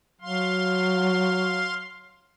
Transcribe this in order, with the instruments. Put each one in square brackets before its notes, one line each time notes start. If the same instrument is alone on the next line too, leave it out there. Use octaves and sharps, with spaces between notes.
[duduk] F#3 [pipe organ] F5 C6